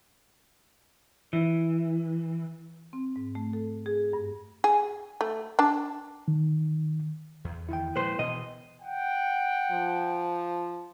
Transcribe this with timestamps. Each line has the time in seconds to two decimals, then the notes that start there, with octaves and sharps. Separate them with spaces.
1.33 E3
2.93 C4
3.16 G#2
3.35 A3
3.53 A4
3.86 G#4
4.13 G2
4.64 G#4
5.21 A3
5.59 D4 A5
6.28 D#3
7.44 E2
7.69 E2 D#3 E4 G5
7.96 A#2 F3 G#3 B4 C5
8.19 B2 E3 D#5
8.82 F#5 G5
9.71 F3